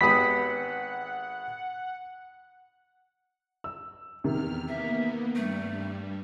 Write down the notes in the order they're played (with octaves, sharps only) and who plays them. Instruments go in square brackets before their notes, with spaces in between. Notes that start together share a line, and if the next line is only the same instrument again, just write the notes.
[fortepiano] G#1 B3 G4 [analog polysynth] F#5 [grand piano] B5 D#6 [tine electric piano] B6
[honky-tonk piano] E6
[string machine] E2 F6 [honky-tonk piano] C3 D#3
[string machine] A#3 B3 [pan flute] E5
[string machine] G2 G3 [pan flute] A3